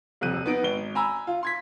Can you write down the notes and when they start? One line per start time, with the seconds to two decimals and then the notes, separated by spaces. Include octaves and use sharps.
0.21 D#1 F2 C3 F#6 D#7
0.46 B3 D#4 D7
0.63 G#1 G7
0.95 G#5 A#5 B5 E6
1.27 F4
1.43 C6 G#6 B6